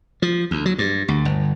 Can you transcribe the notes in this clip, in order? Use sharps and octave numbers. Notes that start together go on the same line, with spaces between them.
F3
D2
F#3
G2
D2
G1